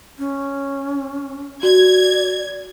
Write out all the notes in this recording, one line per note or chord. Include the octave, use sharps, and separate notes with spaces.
C#4
F#4 D5 G#6